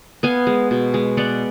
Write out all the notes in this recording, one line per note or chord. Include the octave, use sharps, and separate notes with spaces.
B3 F5 G#5
G#3
B2
G#3
B3 D5 F#5